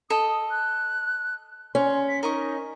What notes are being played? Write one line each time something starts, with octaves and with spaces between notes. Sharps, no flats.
A4 D#5 D#6
F#6
C#4 C6
B6
D#4 A#4 D#5 C#6